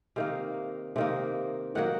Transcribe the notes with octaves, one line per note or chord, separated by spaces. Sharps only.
C3 D#3 A#3 F5
C3 D#3 A#3
D#3 F#3 A#3 F#5